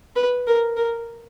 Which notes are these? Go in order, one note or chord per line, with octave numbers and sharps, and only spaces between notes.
B4
A#4
A#4